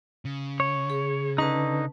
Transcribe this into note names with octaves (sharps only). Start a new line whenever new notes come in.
C#3
C#5
G#4
D3 C#4 D#4 B4 A5